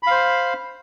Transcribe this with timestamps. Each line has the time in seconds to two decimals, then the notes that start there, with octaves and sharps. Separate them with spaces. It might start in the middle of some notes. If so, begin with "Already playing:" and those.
0.03 B5
0.07 F5
0.11 C5